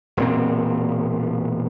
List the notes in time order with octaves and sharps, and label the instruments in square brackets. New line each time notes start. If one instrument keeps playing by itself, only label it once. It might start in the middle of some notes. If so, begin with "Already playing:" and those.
[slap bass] E1 A#2 C4